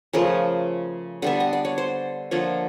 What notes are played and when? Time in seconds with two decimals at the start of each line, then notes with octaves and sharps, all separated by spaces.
0.13 C#3 F3 A3 A#4
1.22 D3 G3 B3 E5
1.40 D#5
1.53 D5
1.65 C#5
1.78 C5
2.31 D3 F3 A#3 C#5